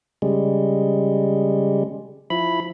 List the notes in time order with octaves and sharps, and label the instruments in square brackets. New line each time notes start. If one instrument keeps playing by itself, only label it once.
[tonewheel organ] C#3 G3 G#3
F3 E4 B5